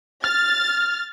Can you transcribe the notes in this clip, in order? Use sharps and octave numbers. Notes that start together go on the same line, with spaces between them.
F6 A6